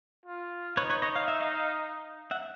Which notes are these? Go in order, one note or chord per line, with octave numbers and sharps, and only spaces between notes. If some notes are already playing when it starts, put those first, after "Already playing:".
F4
D#4 B4 C#5
B4 C#5
C#5 D#5
F5
E5
D#5 F5
E5 F#5